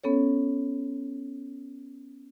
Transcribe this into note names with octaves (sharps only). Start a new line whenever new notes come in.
B3 C#4 A4 C#5